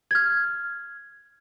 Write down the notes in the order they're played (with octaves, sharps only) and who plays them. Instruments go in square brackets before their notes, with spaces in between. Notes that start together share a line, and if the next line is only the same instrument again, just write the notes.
[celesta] F6 G#6